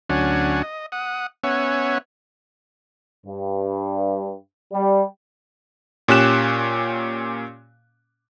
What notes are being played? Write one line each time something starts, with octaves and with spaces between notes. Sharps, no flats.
D2 F#3 C#4 D4 F#5 G#5
D#5
F#5 D#6
B3 C#4 C#5 E5 F#5 G#5
G2
G3
A#2 C#4 G4 F#6 E7